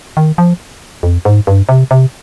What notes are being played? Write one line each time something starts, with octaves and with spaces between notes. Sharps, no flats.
D#3
F3
F2
G#2
G2
C3
C3